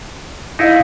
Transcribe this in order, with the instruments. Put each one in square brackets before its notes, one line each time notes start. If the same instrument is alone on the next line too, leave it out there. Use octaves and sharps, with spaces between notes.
[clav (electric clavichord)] D#4 E4 [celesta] D#5 F5 A#6